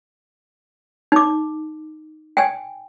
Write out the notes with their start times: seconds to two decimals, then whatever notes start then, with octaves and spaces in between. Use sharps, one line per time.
1.12 D#4 D6
2.37 G5 G#5